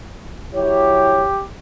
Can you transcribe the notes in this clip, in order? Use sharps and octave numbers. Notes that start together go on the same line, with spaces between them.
F#3 E4 G4 C#5